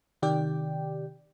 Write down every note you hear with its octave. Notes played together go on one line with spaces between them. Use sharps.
C3 D#3 G4 D5 G5